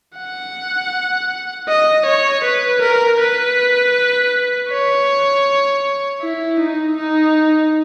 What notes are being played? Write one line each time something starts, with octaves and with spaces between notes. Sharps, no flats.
F#5
D#5
C#5
B4
A#4
B4
C#5
E4
D#4
D#4